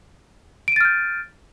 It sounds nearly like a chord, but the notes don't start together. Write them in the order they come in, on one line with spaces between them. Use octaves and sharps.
D7 D#7 A6 F6 G6